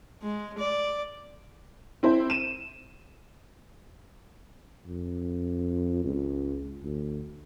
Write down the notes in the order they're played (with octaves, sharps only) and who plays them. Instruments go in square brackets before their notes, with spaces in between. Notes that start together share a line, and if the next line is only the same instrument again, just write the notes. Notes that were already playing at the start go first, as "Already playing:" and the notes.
[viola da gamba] G#3
D5
[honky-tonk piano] C4 E4 C5
D#7 E7
[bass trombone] F2
C#2
D2